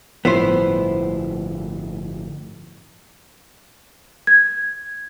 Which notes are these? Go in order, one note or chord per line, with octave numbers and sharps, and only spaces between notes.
G1 A2 F3 B3 E4 C5
G#6